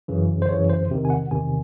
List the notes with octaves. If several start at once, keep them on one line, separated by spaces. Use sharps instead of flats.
F#2 C#3 E3
C5
F#2 C#3 E3 C#5
C5
E2 C3 D#3
G#5
F#5
E2 C3 D#3 G#5